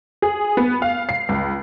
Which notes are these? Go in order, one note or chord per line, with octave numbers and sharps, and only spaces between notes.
G#4
B3
F5
C7
C#2